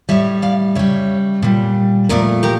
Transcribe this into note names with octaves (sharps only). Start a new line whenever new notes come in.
A2 G3 C#5 E5
D5 F5
C#3 G3 C#5 E5
A#2 G3
A#2 F3 A3 A#4 D5
G4 A#4